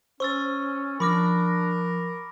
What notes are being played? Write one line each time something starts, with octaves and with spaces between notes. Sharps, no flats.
C#4 C5 C#6 E6 A6
F3 D4 A#4 B5 D6 F6 A#6